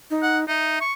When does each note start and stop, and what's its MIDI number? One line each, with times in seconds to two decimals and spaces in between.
0.10 0.47 63
0.23 0.39 78
0.48 0.76 63
0.48 0.81 76
0.81 0.93 85